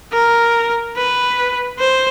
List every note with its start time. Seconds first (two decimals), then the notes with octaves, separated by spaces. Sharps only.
0.13 A#4
0.96 B4
1.79 C5